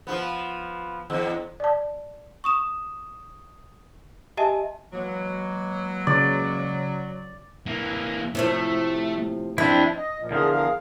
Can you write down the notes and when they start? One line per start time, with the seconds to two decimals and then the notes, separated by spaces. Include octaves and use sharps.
0.07 F3 B3
1.10 E2
1.60 D5 A5
2.44 C#6 D#6 E7
4.37 G4 D#5 E5 G#5 A5 D#7
4.93 E3 F#3 G#3 A#3
6.07 C#3 D5
7.66 E3 A#3
8.35 A2 C3 F3 A3
9.58 F2 D4 E4 C5 G5
9.95 D#5
10.19 A#2 F3
10.31 E2 D3 F3 G#4 A#4
10.52 G#4 A#4 F5